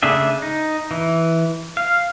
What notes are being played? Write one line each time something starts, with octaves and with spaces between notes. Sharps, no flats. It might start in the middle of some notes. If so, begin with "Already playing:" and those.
C#3 A3 D4 G#4 E5
D#4
E3
F5